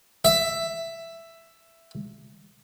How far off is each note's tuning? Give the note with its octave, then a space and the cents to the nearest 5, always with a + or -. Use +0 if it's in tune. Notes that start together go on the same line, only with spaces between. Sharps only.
E5 +10